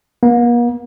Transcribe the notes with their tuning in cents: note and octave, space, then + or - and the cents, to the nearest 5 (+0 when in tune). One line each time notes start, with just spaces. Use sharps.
A#3 +45